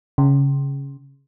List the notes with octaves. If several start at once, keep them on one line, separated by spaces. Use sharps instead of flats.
C#3